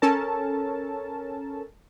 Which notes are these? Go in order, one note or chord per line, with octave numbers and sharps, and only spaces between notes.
C#4 A4 A#4 A5